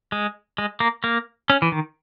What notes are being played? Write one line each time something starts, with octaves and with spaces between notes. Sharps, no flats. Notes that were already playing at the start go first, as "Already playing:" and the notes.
G#3
G#3
A#3
A#3
C#4
E3
D#3